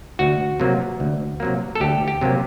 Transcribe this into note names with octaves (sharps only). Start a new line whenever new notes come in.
D2 F#4
C3 F#3 A#3
D2
C3 F#3 A#3
A4
D2 G4
G4
C3 F#3 A#3